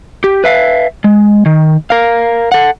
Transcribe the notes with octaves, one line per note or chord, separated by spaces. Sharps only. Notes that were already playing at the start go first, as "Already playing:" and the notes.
G4
B4 E5 F5
G#3
D#3
A#4 F5
A4 F#5